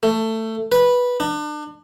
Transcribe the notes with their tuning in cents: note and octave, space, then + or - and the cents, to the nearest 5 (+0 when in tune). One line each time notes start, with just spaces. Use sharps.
A3 +15
B4 -10
D4 +35